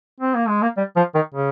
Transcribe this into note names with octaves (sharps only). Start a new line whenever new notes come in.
C4
A#3
G#3
A#3
G3
F3
D#3
C#3